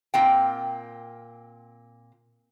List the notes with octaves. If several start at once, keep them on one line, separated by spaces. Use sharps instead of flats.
A#2 C4 G5